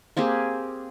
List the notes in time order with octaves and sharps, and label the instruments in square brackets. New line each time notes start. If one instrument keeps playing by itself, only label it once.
[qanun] A#3 C4 G4 G#4